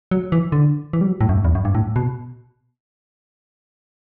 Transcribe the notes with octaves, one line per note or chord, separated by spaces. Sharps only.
F#3
E3
D3
E3
G3
F#3
A2
F#2
G2
E2
F#2
G2
A2
B2